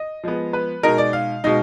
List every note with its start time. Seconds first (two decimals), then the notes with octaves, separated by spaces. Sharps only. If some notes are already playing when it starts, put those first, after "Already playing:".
Already playing: D#5
0.24 F3 G#3 B3
0.53 B4
0.83 B2 G#3 D#4 A#4
0.98 D5
1.13 F5
1.44 B2 G#3 D#4